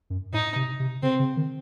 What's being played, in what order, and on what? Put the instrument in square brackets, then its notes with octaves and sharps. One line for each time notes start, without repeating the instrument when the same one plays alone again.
[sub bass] F#2
[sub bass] A2 [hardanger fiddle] D#4
[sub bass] C3
C3
[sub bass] C#3 [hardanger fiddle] C4
[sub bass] C#3
D#3